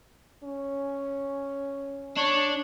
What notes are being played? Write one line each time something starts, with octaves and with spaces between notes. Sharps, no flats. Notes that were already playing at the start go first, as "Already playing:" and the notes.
C#4
D4 C#5